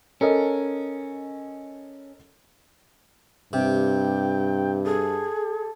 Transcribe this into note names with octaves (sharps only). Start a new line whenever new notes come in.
C#4 A4 A#4 D#5
G2 C3 G5
G#4 A4